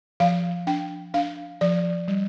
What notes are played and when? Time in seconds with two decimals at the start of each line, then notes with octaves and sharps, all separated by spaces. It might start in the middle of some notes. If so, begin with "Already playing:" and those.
0.20 F3 F5
0.67 D4 G5
1.14 D4 F5
1.61 F3 D5
2.08 G3